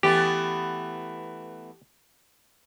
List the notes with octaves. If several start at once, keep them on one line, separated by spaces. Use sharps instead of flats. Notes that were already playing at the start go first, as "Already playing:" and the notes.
E3 A3 B3 G4